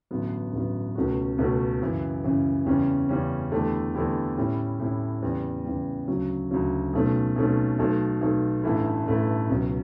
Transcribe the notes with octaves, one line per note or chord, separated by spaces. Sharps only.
A1 G2 D3 F#3 B3
A1 G2 D3 F#3 B3
C#2 B2 A3 C#4 F#4
C#2 B2 A3 C#4 F#4
F#2 C#3 E3
F#2 C#3 E3
E2 C#3 G3 C#4
E2 C#3 G3 C#4
E2 D3 A3 E4 G4
E2 D3 A3 E4 G4
A2 G3 C#4 E4
A2 G3 C#4 E4
E2 C#3 G3
E2 C#3 G3
D2 C#3 F#3
D2 C#3 F#3
B1 B2 A3 C#4
B1 B2 A3 C#4
B1 B2 A3
B1 B2 A3
A1 G2 E3 A3 E4
A1 G2 E3 A3 E4
C#2 B2 F#3